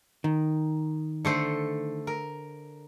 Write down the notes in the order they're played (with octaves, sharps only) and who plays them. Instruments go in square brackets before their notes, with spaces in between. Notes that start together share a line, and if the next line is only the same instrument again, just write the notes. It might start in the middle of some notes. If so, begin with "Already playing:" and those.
[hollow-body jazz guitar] D#3
[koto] D3 A3 C5
A#4